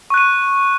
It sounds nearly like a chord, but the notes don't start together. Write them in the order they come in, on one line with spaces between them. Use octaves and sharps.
C#6 F#6 D#7